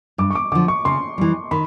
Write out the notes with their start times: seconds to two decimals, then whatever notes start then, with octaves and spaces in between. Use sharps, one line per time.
0.18 G2 D6
0.30 C#6
0.35 D6
0.52 D3 F3 D6
0.68 C#6
0.85 C#3 C6
1.18 E3 G3
1.51 D#3 B5